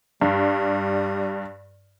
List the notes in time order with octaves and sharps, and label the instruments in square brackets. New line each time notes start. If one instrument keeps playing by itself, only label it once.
[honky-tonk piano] G2 [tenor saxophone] G3